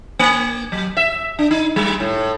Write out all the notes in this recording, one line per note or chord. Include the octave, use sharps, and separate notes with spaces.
A#3
F#3
E5
D4
D#4
G3
A2